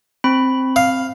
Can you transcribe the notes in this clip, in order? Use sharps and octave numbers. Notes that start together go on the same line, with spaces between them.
C4 B5
F5